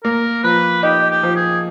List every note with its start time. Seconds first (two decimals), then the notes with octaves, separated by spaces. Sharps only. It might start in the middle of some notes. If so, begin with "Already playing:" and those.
0.04 A#3 A#4
0.43 F3 B4
0.83 D#4 G4
1.10 G4
1.23 F3
1.36 G#4